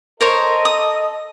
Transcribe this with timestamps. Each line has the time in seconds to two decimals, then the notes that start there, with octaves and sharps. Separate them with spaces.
0.21 A4 A#4 C5 C#5 D#5
0.65 D#6